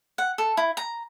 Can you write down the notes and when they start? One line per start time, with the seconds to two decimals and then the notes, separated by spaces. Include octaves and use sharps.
0.18 F#5
0.38 A4
0.57 E4
0.77 A#5